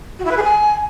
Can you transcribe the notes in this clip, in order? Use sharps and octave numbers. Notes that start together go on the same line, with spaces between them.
F#4
E4
B4
G#4
G#5